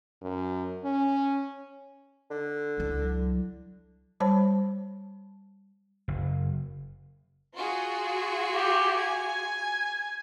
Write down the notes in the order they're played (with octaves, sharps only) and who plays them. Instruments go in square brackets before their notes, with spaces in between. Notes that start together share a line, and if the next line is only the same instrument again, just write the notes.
[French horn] F#2
C#4
[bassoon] D3
[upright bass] C#2 E4
[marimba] F#3
[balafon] G3 C5 C#5 A5 B5
[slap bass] F#1
[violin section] F4 F#4 G#4
[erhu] G4
G#5